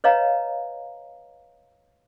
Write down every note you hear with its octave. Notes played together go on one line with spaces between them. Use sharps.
B4 C#5 D#5 F5 A#5